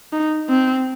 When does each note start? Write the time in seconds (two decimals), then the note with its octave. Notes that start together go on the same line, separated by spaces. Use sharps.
0.12 D#4
0.49 C4